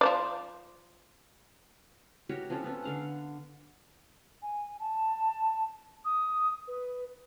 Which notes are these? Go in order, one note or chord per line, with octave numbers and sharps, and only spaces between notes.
F3 C5 D5
F#4 G4 A#4 C#5
F3 C4 C#4 A4
B3 C#4
D3 F5 F#5
G#5
A5
D#6
B4